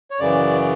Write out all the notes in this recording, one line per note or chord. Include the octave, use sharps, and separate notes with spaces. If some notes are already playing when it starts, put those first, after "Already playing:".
C#5
F#2 C#3 E3 D5